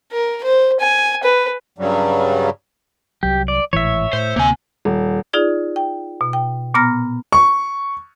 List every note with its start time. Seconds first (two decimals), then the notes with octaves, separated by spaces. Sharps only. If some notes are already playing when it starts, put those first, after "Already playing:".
0.12 A#4
0.44 C5
0.81 G#5
1.23 B4
1.79 G2 C#3 F#3 G3
3.23 C2 F#3 G4
3.48 D5
3.73 G#1 A2 E3 C#5 E5
4.13 A2 C5
4.36 D2 C3 A#3 G#5
4.85 D#1
5.33 D#4 F4 G#4 D5
5.76 G5
6.21 B2
6.33 G5
6.74 A#2 B3 A#5 F6 A#6
7.32 C#6